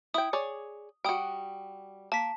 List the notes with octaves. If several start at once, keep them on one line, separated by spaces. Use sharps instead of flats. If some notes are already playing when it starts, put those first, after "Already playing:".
E4 G5 D#6
G#4 C#5 D5
G3 F#4 G5 D#6
A#3 A5 B6